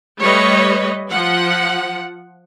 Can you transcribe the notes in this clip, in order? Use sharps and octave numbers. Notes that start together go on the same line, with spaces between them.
G3 A3 B4 C#5 D#5
F3 F#5